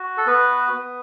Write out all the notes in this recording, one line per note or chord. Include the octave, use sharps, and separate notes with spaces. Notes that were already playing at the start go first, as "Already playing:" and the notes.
Already playing: F#4
A4
B3 B4
B3